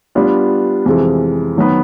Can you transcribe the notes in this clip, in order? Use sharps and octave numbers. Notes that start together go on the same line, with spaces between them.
G3 B3 D4 F4
F2 C3 E3 G#3
D#3 F#3 B3